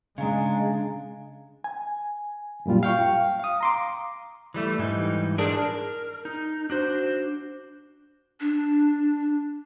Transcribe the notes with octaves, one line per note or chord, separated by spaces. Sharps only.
C#3 G#3 D4 F5 G#5 A#5
G#5
F#2 A#2 G3 F4
F5 G5 C#6
F5 D#6
A#5 C6 D6
E3 G3 A3
G#2 E3 G3 D#4
D4 G#4 A#4
A#4
D#4
D4 F#4 C5
D4